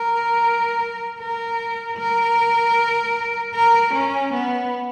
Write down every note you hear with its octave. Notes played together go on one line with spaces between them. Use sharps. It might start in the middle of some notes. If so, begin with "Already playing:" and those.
Already playing: A#4
A#4
A#4
A#4
C#4
B3